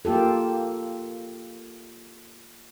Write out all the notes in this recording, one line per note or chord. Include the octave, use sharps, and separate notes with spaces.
A#3 F4 G4 A4